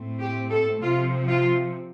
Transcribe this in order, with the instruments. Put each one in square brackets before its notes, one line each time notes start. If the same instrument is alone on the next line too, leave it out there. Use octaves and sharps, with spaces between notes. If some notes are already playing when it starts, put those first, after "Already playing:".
Already playing: [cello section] A2 A3 C4
G4
A4
C3 F3 C4 F4
F4